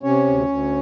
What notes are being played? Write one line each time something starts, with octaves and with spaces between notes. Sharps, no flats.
C3 C#4 C#5
D2
D2